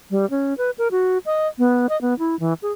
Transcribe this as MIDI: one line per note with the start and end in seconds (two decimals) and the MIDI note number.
0.11 0.29 55
0.30 0.57 61
0.58 0.71 71
0.78 0.88 70
0.91 1.18 66
1.26 1.48 75
1.59 1.87 59
1.89 1.99 75
2.01 2.17 59
2.19 2.38 64
2.40 2.54 52
2.62 2.72 68